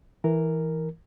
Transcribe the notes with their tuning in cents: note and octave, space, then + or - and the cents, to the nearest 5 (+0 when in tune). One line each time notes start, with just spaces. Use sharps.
E3 -10 A#4 +0